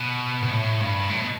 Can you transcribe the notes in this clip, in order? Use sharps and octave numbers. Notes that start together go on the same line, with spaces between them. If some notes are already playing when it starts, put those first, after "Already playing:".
Already playing: B2
B2
A2
G2
A2
B2